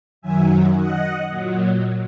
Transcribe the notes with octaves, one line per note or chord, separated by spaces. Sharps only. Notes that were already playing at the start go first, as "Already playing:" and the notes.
F#2 D#3 F#3 E5 G#5
D#5 F#5
A#2 F#3